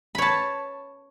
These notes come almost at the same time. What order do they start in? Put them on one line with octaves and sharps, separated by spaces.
B5 C#5 A5